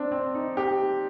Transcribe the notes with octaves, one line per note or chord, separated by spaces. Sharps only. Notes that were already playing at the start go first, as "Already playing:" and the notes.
Already playing: C4 D4
C4
D#4
G4